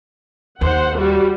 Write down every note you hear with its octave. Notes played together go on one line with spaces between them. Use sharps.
D#2 C5 F#5
G3 F#4